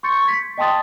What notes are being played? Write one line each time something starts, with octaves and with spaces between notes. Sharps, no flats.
C6 C#6 G6 A6 C#7
G#6 B6
D#5 G5 A5 C6 D#6 A6